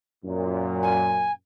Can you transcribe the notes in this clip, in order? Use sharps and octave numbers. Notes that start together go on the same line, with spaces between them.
F#2 A#2
G#5